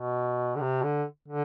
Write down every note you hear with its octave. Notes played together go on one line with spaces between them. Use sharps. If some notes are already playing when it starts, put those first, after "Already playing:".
Already playing: B2
D3
C3
D3
D3